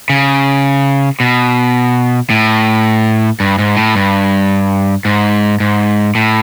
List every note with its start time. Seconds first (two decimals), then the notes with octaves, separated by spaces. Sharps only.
0.10 C#3
1.20 B2
2.30 A2
3.40 G2
3.59 G#2
3.77 A2
3.95 G2
5.05 G#2
5.60 G#2
6.15 A2